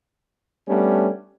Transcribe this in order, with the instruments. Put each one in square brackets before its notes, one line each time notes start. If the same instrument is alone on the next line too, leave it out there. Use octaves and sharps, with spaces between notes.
[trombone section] G3 A3 B3 C#4 D4 G4